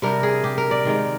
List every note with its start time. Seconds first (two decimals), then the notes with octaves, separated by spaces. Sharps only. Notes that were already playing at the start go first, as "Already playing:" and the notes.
0.02 C3 G3 D4 A#4
0.23 G#4
0.44 G4
0.58 A#4
0.71 D5
0.85 D#3 G#3 D#4